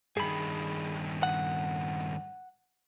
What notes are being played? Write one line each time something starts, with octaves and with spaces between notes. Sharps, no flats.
G2 D#3 G#4 B5
F#5